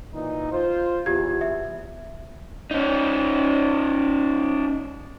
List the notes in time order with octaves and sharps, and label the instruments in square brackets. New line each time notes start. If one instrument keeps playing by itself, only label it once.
[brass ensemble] A#2 E3 D#4
F4 C5
[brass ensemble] E2 [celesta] F4 G4 G#6
[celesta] E5
[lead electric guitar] C#4 D#4